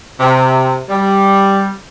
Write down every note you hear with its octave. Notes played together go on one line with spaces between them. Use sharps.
C3
G3